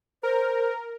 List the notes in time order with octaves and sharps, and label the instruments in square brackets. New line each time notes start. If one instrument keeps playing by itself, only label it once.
[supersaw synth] A#4 [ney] C5